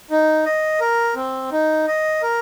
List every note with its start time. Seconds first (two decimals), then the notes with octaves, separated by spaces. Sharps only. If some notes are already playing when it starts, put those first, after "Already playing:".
0.11 D#4
0.46 D#5
0.80 A#4
1.16 C4
1.52 D#4
1.87 D#5
2.22 A#4